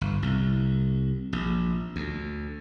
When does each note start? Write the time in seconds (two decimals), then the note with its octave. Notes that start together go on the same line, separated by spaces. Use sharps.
0.01 G1
0.22 C2
1.33 A#1
1.96 D2